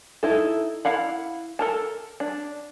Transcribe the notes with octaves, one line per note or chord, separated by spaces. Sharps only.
D#4 E4 A4
E4 F5 F#5 B5
A4 A#4 A5
D4